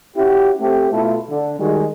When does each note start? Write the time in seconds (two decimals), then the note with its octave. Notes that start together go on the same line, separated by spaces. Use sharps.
0.16 C#4 E4 F#4 G4
0.60 A3 C4 G4
0.91 B2 A3 E4 F4 A4
1.30 D3
1.59 D#3 G3 G#3 D#4 F#4 G#4